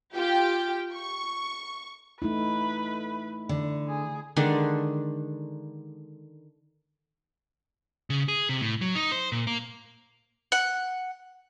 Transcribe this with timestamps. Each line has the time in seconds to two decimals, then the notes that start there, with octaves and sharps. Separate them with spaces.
0.14 F4 G4 G5
0.94 C#6
2.22 A3 D#4 E4 B4
3.49 D3
3.88 G#4
4.36 D3 D#3 G#3 D4
8.10 C#3
8.28 G#4
8.49 C3
8.61 A2
8.81 F#3
8.95 D#4
9.12 C5
9.32 A#2
9.47 A#3
10.52 F#5